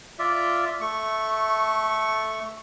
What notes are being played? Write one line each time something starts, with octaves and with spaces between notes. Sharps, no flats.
F4 D5 E5
A3 C#6